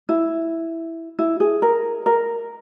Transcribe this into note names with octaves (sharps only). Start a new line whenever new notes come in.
E4
E4
G#4
A#4
A#4